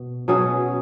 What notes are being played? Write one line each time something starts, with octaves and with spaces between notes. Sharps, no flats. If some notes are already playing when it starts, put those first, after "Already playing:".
Already playing: B2
B2 F#3 C#4 G#4